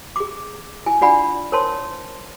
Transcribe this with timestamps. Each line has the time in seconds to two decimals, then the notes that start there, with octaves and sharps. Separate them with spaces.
0.16 G#4 D6
0.86 E4 G#5
1.01 D4 F4 D5 F#5 G#5 B5
1.52 A#4 C5 C#5 A5 C6